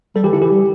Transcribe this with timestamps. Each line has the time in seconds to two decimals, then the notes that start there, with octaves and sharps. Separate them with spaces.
0.15 G3 A4
0.23 E3 G4
0.32 D3 E4
0.41 E3 G4
0.50 G3